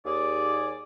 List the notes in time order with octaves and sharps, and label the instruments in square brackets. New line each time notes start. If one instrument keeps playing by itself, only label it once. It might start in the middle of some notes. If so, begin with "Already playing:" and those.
[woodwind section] D#2 G#4 D5